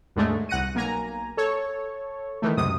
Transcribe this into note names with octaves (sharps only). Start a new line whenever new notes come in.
D#2 G#2 D3 G#3 A3
C2 F#5 F#6 A#6 C#7 D#7
B1 A#3 G#5 A#5
A4 C#5
D#3 E3 A3
C#2 F#2 C3 D#6